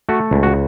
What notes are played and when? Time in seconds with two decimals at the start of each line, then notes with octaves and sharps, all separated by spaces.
0.09 A3 F#4
0.31 C#2
0.43 F#4